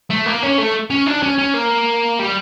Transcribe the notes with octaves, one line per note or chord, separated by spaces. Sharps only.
A3
A#3
C#4
A3
C#4
D4
C#4
C#4
A#3
G3